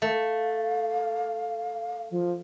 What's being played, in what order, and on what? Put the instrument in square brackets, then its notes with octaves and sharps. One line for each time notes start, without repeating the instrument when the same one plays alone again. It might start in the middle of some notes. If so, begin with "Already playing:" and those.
[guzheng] A3 [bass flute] F5
[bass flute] F3